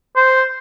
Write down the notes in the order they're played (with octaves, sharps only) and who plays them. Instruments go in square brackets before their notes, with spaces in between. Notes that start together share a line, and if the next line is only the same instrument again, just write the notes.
[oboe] C5